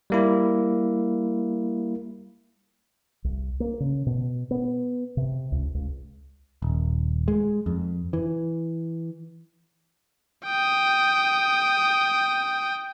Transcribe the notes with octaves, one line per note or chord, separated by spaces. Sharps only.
G3 A#3 E4
C2
A#3
C#3
B2
B3
C3
C#2
C#2
D#1
G#3
F2
E3
G5 D#6